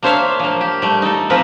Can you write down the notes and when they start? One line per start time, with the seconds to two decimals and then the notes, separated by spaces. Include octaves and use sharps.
0.03 A#3 D4 C5 C#5 E5 F5
0.40 F3 A#3
0.61 G4
0.82 G3 A3
1.02 D#4 A4
1.30 F3 A#3 C4 A#4 B4